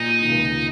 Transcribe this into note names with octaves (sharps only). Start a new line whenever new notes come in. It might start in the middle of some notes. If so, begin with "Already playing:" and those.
Already playing: A#2 D#4
D#3
C#2 C#3